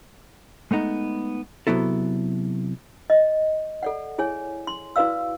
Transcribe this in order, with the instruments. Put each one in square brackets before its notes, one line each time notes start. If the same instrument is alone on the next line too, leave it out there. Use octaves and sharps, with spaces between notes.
[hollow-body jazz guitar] G#3 A3 B3 D#4
C3 F#3 B3 E4 A4
[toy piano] D#5
A4 D5 F#5
E4 G#4 C#5 G#5
C6
E4 F#4 B4 D5 F5 E6